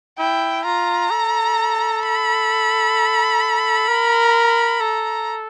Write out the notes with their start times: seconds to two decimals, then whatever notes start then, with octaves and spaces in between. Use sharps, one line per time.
0.18 E4 G5
0.65 F4 A#5
1.11 A4
2.03 B5
3.88 A#4
4.80 A4 A#5